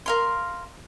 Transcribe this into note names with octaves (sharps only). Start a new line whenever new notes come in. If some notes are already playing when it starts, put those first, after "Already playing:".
A#4 F5 C6